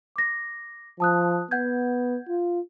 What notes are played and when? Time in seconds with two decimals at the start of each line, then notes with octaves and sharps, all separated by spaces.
0.16 D6 A#6
1.00 F3 A5 D#6 F#6
1.51 B3 F#5 G6 G#6
2.29 F4